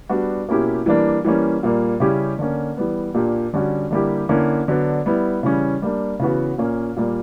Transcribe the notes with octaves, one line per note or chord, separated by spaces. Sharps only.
G3 B3 D4 F#4
B2 A#3 C#4 E4 G4
E3 G3 A#3 D4
E3 G3 A#3 C#4
A#2 G3 A#3
C#3 G3 C#4 E4 G4
D3 A#3 C#4
E3 G3 B3
A#2 A#3 D4 G4
D3 G3 C#4 F#4
D3 G3 A#3 E4 G4
D3 A#3 C#4 E4
D3 F#3 B3 D4
G3 B3 E4
C#3 E3 G3 C#4
G3 A#3 D4
C#3 E3 B3 F#4
A#2 A#3 C#4
A#2 G3 A#3